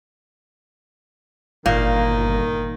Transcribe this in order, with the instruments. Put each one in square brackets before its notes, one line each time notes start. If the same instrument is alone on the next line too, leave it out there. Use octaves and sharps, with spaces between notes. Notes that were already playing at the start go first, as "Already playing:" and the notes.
[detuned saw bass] G1 [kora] A#2 [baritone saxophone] D#3 [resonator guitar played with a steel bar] A#3